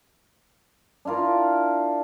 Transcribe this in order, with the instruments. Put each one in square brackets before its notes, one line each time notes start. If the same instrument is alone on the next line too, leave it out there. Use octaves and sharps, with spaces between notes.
[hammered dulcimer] D4 E4 F4 A#4